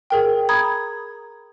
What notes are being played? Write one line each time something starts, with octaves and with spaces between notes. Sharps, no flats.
G#4 A#4 G5
A#5 B5 D#6 G#6